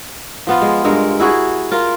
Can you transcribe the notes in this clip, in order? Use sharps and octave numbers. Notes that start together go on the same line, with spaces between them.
F3 B3 F4
G#3
G2 G#3 A#4
E4 F#4 G#4
F4 A#4